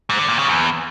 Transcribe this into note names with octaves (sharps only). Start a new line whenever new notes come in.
G#2
D3
A#2
C#3
E2